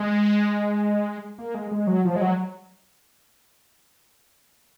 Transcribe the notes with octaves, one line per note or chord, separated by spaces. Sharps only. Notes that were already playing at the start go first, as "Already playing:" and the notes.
Already playing: G#3
A#3
G#3
G#3
F#3
F3
G#3
F#3